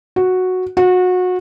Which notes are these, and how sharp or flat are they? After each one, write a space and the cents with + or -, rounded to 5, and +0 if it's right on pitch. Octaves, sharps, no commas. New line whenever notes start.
F#4 -5
F#4 -25